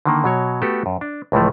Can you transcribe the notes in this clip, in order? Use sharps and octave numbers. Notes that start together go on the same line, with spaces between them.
D3 D#3 A#3
B2 F#3 C#5
A3 B3 F#4 G4 A4
F#2
D4
C#2 A2 E3 F3 A3